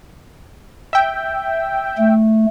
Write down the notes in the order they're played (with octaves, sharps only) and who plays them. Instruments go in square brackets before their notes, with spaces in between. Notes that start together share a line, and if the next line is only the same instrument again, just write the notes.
[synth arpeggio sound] E5 G5
[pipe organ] A3